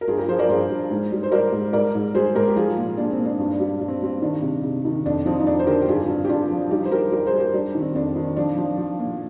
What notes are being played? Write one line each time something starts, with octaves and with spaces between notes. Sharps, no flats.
A#4
G2 F4 G#4
G4 A#4
F3 G#4 C5
A#4 D5
G2 G#4 C5
G2
G#2
G3
C5
G3 A#4 D5
G#2
G#2 A#4 D5
G#2
G3 G#4 C5
G#2 G4 A#4
G4
F3 F4 G#4
A#2
A#2 D4
C4
A#2
D4
G2
G3
G2 D4
C4
G3 C4
D#3 D4
C3
C3
D#3
F2 D4
F3 C4 D#4
D#4
F2 D4
C5
D3 G4 A#4
G4
G2 F4 G#4
G2
G4
G2 D4 F4
F3
G3 D#4 G4
C5
G3 G4 A#4
G3 G4 A#4
G#4 C5
G3
G4 A#4
G3 D4
D#3
C4
F2 D4
D#3
F3 D4
F3
F3
A#2